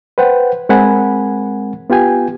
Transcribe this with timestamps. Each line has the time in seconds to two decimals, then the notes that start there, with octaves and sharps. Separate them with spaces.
0.18 B4 C5 F#5 G5
0.69 G#3 C4 A#4 F#5 G#5 B5
1.90 B3 F4 G4 G5 G#5